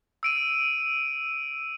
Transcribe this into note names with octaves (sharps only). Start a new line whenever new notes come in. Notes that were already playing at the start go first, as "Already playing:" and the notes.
E6 D7 D#7